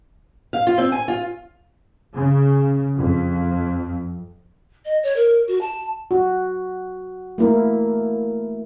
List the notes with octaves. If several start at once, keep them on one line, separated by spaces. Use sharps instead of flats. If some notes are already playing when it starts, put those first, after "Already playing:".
F5
F4
C4
G#5
F4
C#3
F2
D#5
C#5
A#4
F#4
A5
F#4
A3 A#3 E4 A#4